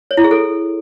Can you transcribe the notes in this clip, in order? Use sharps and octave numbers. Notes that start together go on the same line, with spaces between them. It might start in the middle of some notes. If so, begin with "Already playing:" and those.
C#5
E4
G#4
A4